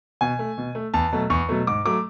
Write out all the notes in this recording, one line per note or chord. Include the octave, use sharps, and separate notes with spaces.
B2 G#5
A3
B2
A3
E2 A5
B2 F#3 A3
E2 C#6
B2 F#3 A3
G#2 D6
F#3 A3 D6